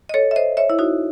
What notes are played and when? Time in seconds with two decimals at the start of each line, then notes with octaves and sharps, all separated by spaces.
0.09 D#5
0.14 A4 C#5
0.31 E5
0.36 C5 D#5
0.57 C#5 E5
0.70 E4
0.79 D#4 F#4